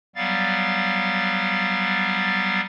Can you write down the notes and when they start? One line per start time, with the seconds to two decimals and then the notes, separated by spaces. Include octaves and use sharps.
0.16 F#3 G3 B3 F5 A6